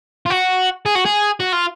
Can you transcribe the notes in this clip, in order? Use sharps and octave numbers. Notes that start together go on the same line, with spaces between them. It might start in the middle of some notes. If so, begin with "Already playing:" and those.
F4
F#4
G#4
F#4
G#4
F#4
F4